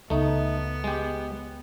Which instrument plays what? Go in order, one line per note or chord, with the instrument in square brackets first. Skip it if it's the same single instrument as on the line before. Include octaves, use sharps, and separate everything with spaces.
[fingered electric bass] C#2 [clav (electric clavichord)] A3 D#4 [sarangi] B3
[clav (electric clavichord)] G#3 G4